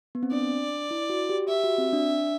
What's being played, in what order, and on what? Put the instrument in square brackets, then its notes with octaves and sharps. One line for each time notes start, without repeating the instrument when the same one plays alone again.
[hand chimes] B3
C4
[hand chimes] D4 [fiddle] D5
[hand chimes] E4
F#4
G4
[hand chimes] G4 [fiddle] E5
[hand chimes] F#4
C4
D4